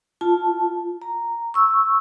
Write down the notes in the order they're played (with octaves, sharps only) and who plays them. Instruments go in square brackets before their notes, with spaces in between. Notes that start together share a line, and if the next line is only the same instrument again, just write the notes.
[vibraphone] F4 A5
A#5
C#6 E6